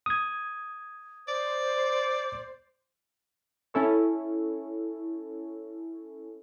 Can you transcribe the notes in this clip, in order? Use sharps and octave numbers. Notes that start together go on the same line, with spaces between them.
D#6 G#6
C5 D5
C#4 E4 A4 C#5